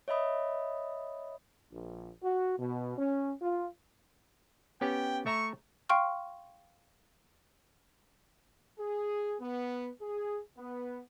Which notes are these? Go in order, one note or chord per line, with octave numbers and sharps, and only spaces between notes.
C#5 D#5 E5 B5 D#6
A#1
F#4
B2
C#4
F4
B3 C#4 G4 G5
A3 E5 A#5 C#6
F5 G5 C6 C#6 F6
G#4
B3
G#4
B3